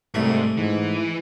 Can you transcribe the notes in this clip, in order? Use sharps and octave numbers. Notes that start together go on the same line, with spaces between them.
C2 G#2 A3
G#2 E3